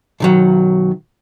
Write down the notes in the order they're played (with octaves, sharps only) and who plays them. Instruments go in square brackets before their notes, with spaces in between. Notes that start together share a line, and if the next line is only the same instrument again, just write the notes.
[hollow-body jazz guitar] B1 D#3 F#3